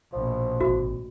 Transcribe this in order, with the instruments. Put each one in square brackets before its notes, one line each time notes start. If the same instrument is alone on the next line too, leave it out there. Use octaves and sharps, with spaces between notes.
[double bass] A#1 B2 [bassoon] F3
[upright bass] G#1 A2 [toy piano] F#4